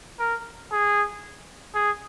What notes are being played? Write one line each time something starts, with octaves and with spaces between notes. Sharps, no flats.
A#4
G#4
G#4